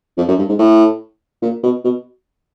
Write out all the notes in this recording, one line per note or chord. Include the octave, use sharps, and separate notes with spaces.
F2
F#2
G2
G#2
A2
A#2
B2
B2